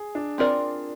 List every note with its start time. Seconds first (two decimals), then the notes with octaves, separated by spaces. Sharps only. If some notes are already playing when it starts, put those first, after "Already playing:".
Already playing: G#4
0.15 D4
0.38 C4 F4 A#4 D5